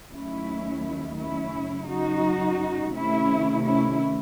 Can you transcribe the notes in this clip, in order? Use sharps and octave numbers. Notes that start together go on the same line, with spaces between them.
D#2 D#3 F#3 A3 C#4 E4
C#4 E4
F#2 C#3 F#3
D#4 F#4
C3 D#3 A3 C#4 E4
C#4 E4